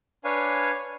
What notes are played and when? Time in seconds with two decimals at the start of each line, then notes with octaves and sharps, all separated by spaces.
0.24 D4 B4 C#5 F5 G#5